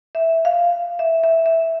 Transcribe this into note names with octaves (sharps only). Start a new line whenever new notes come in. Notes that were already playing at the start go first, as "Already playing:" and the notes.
E5
F5
E5
E5
E5